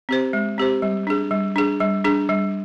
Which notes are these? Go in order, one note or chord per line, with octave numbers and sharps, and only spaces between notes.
C4 G4 C5
G#3
C4 G4 C5
G3
D4 G#4
G3
D4 G#4
G3
D4 G#4
G3